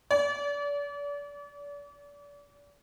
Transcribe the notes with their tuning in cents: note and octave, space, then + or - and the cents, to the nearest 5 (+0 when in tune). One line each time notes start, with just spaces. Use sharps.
D5 -40